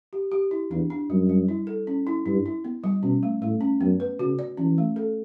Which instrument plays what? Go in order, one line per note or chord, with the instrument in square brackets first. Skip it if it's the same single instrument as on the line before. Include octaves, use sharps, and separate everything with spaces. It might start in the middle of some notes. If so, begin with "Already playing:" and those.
[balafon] G4
G4
E4
[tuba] E2 [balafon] D4
[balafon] D4
[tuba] F#2 [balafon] G3
[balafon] G3
E4
A4
C#4
E4
[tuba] G2 [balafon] E4
[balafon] E4
B3
G3
[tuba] B2 [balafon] C#4
[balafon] A3
[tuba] A2 [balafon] A3
[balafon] C#4
[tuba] F#2 [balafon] B3
[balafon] B4
[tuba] C#3 [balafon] F#4
[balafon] D5
[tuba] E3 [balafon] C#4
[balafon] A3
A4